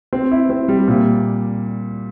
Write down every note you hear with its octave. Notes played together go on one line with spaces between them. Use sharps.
C4
E4
C4
G3
A#2